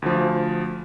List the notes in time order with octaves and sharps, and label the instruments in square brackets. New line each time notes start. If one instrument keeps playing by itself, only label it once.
[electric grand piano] D2 F3